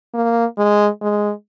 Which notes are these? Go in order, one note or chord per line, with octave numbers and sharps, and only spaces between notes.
A#3
G#3
G#3